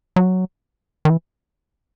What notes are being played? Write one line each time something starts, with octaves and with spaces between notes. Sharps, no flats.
F#3
D#3
E3